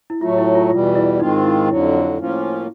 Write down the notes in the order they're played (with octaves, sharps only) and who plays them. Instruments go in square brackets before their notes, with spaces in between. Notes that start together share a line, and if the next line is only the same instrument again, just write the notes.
[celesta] E4
[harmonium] A2 F#3 A3 [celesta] F4
[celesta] E4
F4
[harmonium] E2 B2 G3 [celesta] F4
[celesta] E4
[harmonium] G#2 D#3 G#3 C4 F4 [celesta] D#4
[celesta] E4
[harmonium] F2 D3 F#3 [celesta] E4
[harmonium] A2 F3 A#3 C#4 F4